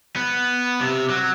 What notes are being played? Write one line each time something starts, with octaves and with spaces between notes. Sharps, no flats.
B3
C3
F#3